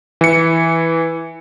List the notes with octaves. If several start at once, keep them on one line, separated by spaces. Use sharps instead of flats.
E3 C#7